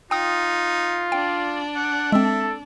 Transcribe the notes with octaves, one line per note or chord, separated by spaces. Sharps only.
D#4 F4 G5 D#6
D4 D5 G5
F#5
G#3 C4 A4 E5